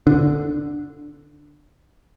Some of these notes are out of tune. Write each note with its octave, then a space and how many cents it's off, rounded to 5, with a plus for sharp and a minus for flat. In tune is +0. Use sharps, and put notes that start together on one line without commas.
D3 +0 D4 +10